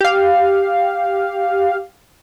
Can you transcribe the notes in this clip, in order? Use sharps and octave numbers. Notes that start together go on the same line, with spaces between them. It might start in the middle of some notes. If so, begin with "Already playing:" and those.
G4 F5